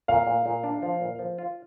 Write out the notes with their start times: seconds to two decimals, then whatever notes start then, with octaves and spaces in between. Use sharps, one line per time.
0.08 A#2 F5
0.27 A#2
0.46 A#2
0.64 D4
0.82 F3
1.01 A#2
1.19 F3
1.38 F4